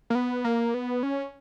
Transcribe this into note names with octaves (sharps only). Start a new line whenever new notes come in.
A#3
B3
A#3
B3
C#4